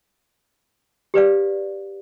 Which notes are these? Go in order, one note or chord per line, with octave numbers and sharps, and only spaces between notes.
G4 B4 D5 F5